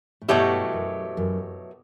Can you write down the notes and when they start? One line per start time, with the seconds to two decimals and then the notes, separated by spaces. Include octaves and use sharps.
0.22 A2
0.28 G2 B2 F#3 A3 E4 G4
0.73 F#2
1.17 F#2